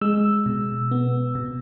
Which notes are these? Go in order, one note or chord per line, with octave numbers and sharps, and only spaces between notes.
G#3 E6
B2
B3
B2